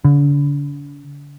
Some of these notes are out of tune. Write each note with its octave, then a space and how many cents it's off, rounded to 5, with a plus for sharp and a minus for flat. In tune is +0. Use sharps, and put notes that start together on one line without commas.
D3 -40